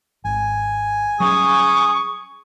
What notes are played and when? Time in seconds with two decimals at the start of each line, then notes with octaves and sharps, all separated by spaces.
0.25 G#1 G#5
1.20 F#3 G3 C#4 G#4 C#6 D#6